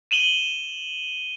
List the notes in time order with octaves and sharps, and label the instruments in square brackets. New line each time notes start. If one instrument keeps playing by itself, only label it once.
[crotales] D#7 E7 F#7 G7